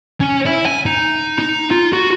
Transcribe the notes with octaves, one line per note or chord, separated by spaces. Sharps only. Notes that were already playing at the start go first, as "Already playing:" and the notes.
C#4
E4
G#5
D#4
D#4
F4
F#4